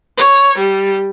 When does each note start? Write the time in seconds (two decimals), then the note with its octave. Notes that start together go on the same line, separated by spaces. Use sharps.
0.17 C#5
0.58 G3